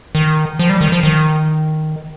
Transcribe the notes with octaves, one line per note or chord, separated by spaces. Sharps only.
D#3
F3
G3
D#3
F3
D#3